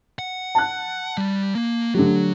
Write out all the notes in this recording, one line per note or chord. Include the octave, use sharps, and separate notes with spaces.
F#5
A5 F#6
G3
A#3
D3 F#3 A3 G4